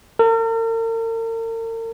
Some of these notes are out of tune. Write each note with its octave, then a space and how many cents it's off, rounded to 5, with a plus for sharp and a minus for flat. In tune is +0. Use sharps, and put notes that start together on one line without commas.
A#4 -45